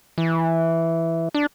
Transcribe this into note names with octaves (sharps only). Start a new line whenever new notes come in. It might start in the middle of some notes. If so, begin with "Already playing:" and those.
E3
D4